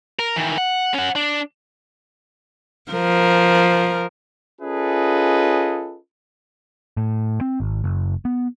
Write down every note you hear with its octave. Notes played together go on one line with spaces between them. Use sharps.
A#4
D#3 E3
F#5
C#4 F#5
D4
F3 A#4
C#4 F4 G#4 A4 B4 D#5
A2
C4
G#1
F#1
B3